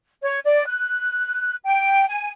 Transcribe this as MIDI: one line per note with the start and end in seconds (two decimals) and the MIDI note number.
0.22 0.39 73
0.45 0.66 74
0.67 1.55 90
1.64 2.06 79
2.09 2.30 80